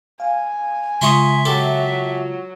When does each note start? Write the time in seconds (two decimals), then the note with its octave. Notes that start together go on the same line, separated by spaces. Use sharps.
0.20 F5 G#5
1.02 C#3 G#3 F4 E5 C6 C#6 D#6
1.45 F#3 G4 A4